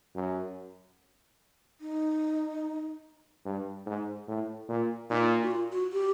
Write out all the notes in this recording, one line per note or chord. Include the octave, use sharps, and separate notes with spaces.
F#2
D#4
G2
G#2
A2
A#2
A#2 D#4
D#4
F#4
F4
F#4
G4